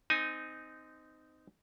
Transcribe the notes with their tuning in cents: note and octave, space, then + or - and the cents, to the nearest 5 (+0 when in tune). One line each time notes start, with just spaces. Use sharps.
C4 -25 D#4 +0 G#5 +0